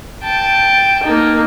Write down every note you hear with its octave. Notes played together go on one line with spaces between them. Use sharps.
G5 A5
A#3 D#4